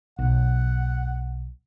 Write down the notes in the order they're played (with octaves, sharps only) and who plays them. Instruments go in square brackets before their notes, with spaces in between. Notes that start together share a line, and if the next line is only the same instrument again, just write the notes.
[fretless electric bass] B1 [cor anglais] F#5